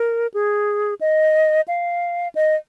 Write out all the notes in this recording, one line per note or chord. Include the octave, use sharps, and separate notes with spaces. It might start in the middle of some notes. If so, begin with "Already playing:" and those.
Already playing: A#4
G#4
D#5
F5
D#5